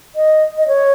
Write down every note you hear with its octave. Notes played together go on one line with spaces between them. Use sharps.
D#5
D#5
C#5